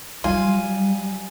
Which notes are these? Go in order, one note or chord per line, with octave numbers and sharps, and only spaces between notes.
F#3 G3 F4 G#5